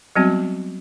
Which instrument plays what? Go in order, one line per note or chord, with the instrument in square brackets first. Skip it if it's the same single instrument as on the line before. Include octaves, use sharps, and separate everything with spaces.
[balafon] F#3 G3 B3 C4 F#4